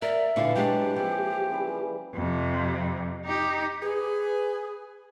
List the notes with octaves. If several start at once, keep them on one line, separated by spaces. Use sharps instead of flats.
A#4 D5 E5
A#2 D3 E3 E4 F#4 B4 F5
F#3 G#3 D4 G4 G5
F3 A#3 C4 G#4 G5
C#3 E3 G3
F2 C3
D#4 G4
G#4 B4